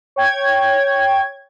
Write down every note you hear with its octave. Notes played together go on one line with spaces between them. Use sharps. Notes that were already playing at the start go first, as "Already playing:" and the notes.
C#5 G5 G#6